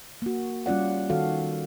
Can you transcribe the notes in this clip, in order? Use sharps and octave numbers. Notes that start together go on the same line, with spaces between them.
A#3 F#4
G3 C#4 F4 D5 F#5
D#3 F#4 A4 F5